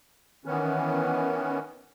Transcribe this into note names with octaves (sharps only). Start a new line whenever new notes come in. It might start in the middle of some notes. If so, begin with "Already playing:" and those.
D#3 E3 B3 C#4